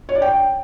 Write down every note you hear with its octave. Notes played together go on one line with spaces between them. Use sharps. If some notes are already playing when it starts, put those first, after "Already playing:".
C#5
D5
G5